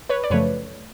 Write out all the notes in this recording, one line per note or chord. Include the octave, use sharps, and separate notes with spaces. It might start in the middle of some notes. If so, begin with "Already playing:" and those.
B4 C#5
D5
F#2 C#3 F3 A3 B4 C#5